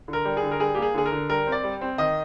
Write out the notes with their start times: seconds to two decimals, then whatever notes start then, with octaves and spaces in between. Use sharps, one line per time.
0.08 D3
0.13 A#4
0.25 G3
0.37 G#4
0.43 D3
0.51 A#4
0.60 G3 G#4
0.75 A#3 G4
0.82 G#4
0.94 D3 G#4
1.06 A#4
1.12 D3
1.29 G3 A#4
1.47 C4
1.52 D5
1.64 G3
1.81 C4
1.98 D#3 D#5